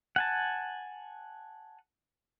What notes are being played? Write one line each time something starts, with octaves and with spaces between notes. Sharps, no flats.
F#5 G#5 A5